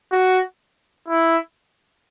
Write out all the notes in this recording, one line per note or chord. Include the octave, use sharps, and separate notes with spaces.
F#4
E4